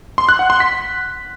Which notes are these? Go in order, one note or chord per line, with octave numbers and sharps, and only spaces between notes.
C6
F#6
F#5
C6
B6